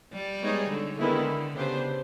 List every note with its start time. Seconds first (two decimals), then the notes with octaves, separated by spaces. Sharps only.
0.13 G3
0.42 G#3 B3 D#4 G#4 C#5
0.70 D3
0.99 D3 D#3 G#3 B3 E4
1.56 C#3 B3 D4 G4 C5